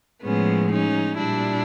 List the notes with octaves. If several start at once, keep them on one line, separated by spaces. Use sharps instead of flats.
A2 F3 G#3 B3 C#4
C#4 D#4
A#2 G3 D4 E4